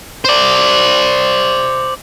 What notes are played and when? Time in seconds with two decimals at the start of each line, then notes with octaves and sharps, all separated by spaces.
0.25 C5 D5